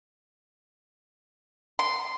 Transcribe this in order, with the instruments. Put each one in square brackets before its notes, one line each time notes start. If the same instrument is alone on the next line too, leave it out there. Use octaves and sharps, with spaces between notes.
[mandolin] C6